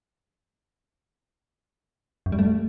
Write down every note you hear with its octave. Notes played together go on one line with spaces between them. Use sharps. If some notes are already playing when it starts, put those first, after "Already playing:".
F#2
G3
A3